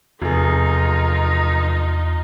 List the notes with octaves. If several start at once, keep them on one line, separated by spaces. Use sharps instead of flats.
F1 E2 D#4 F4 G#4